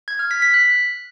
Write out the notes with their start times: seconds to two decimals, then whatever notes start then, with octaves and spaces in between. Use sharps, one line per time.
0.08 G#6
0.19 F6
0.31 B6
0.42 B6
0.54 F#6